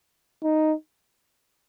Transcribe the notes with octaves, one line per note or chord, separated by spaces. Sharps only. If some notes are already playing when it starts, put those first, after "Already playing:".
D#4